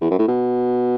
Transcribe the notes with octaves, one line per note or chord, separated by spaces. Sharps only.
E2
F#2
A2
B2